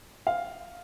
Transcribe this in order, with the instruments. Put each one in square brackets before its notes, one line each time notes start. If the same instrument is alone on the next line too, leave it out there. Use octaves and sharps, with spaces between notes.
[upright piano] F5